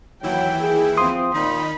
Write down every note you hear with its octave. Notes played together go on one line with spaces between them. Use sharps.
D#2 E3 F#3 E4 G5
G#4
F3 C4 C6 D#6
A#2 D#3 D#4 B5